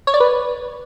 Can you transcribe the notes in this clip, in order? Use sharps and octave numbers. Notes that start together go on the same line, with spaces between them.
C#5
D5
B4